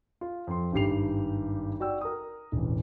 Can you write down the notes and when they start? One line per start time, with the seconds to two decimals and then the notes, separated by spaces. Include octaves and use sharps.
0.21 F4
0.47 F2 C6
0.72 G#1 G2 G4 C7 F7
1.80 F#4 D5 G5 E6
2.01 A#4 D#6
2.52 E1 A1